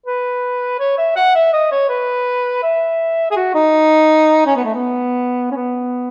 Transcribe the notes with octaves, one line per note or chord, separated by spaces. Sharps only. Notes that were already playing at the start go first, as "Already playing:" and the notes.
B4
C#5
E5
F#5
E5
D#5
C#5
B4
E5
G#4
F#4
D#4
C#4
B3
A3
B3
C#4
B3